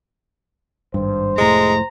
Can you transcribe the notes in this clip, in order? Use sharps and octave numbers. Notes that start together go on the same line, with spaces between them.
G#1 G2 C5
F1 A2 G#3 A3 A#5